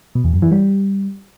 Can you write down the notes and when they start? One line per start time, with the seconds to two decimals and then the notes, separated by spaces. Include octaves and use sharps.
0.15 B2
0.24 E2
0.33 F#2
0.42 E3
0.51 G3